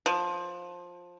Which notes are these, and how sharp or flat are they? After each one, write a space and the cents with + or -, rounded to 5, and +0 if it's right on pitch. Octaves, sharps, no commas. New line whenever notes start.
F3 +15